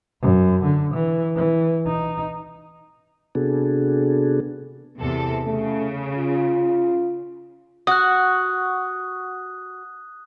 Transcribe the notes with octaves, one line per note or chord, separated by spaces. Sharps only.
F#2
D3
E3
E3
D#4
C3 B3 D4 F#4 G#4 A4
E2 C3 A4
C#3 A3
F4
F#4 D#6 F#6